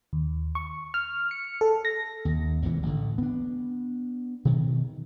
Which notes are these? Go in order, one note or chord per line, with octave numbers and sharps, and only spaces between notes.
D#2
C#6
F6
C#7
A4
A#6
D#2
G#1 E2 C3 E3
A1 D3
B3 D4
B2 D#3 F#3